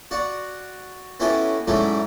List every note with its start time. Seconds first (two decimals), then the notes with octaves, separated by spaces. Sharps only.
0.11 F#4 D5 F#5
1.20 B3 C#4 E4 F#4 G4 A4
1.67 G#2 F#3 A3 C#4 D4 E4